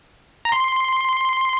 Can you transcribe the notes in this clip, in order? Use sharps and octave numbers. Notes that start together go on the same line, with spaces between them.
A#5
C6